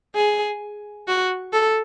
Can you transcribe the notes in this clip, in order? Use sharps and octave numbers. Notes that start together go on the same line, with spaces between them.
G#4
F#4
A4